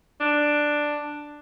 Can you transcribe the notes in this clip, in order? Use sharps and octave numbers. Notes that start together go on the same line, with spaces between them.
D4